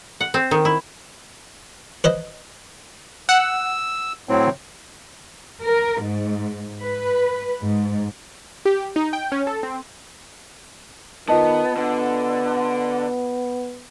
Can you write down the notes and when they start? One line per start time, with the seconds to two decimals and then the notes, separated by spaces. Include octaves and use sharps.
0.21 F#5
0.34 C4
0.51 D#3
0.65 E4
2.04 B4 C5 D#5
3.29 F#5 E6
4.29 A2 F#3 C4
5.63 A#4
6.02 G#2
6.81 B4
7.61 G#2
8.65 G4
8.96 D#4
9.13 G5
9.32 C#4
9.47 A4
9.63 C4
11.28 D#3 B3 F4 D#5 A5
11.77 D3 B3